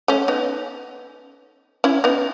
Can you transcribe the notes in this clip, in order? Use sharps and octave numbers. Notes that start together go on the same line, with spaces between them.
A3 C#4
B3 D#4
C#4 E4
B3 D#4